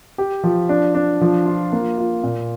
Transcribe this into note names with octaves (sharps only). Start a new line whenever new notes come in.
G4
F3
D4
D4
F3
F4
A#3
F4
A#2